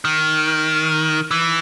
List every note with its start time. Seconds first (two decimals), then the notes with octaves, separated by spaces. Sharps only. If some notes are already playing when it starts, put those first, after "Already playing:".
0.05 D#3
1.31 E3